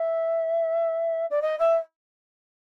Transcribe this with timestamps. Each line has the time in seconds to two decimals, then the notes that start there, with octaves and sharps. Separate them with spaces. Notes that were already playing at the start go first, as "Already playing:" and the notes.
Already playing: E5
1.30 D5
1.42 D#5
1.59 E5